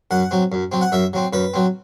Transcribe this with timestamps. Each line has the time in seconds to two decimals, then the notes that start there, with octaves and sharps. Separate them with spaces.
0.11 F#2 F#5
0.31 F#3 C4
0.52 F#2
0.72 F#3 C4
0.81 F#5
0.92 F#2 E5
1.13 F#3 C4
1.33 F#2 B4
1.54 F#3 C4